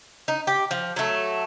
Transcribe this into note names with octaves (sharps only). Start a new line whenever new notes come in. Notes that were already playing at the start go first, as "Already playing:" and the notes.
D#4
G4
F3
F#3 A3